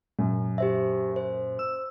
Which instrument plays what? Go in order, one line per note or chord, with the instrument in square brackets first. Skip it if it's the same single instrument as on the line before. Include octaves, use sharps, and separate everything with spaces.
[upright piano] F#2 [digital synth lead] A#2
[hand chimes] G4 C5 E5
C5
[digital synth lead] E6